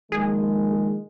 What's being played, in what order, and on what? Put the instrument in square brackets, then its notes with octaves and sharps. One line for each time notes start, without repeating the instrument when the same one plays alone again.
[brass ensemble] A#1 D#3 G#3 [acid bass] G#4